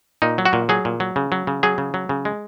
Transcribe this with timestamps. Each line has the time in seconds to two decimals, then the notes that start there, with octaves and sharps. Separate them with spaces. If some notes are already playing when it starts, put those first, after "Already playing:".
0.22 A#2 D#4
0.38 F#3
0.45 F#4
0.53 A#2
0.69 F#3 G#4
0.85 A#2
1.00 F#3
1.16 C#3
1.32 F#3
1.47 C#3
1.63 F#3 G#4
1.78 C#3
1.94 F#3
2.09 C#3
2.25 G#3